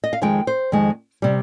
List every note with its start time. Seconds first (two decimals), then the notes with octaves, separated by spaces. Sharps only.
0.04 D#5
0.13 F5
0.22 F2 D#3 G#3 G5
0.47 C5
0.72 F2 D#3 G#3
1.22 C3 G3